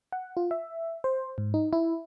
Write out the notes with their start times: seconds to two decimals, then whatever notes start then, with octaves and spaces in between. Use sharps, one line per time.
0.12 F#5
0.37 F4
0.51 E5
1.04 C5
1.38 G#2
1.54 D#4
1.73 E4